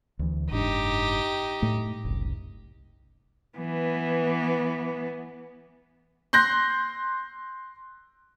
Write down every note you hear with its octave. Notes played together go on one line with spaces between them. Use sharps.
D2 E3
F#1 G#2 D4 D#4 G4
A2 A3
F#1 C2
E3 B3
C6 F#6 G6 A#6